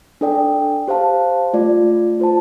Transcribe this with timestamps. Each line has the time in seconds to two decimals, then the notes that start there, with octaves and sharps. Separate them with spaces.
0.21 D4 A4 D5 G5
0.88 G4 C5 F5 A5
1.53 A3 F4 D5
2.20 F4 C5 A5